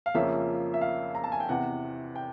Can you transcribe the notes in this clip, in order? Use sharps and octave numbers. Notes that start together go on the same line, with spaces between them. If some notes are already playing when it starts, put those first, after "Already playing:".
F5
F2 C#3 F3 A#3 C#4 E5
E5
F5
A#5
A5
G#5
G5
E2 C3 E3 F#5
G5